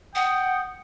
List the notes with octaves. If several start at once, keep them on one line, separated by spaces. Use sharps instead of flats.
F#5 G5 D#6